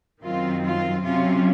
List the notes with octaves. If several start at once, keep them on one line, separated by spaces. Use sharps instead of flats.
F#2 D#3 F#3 C4 F4
F4
C3 F#3 C#4 F4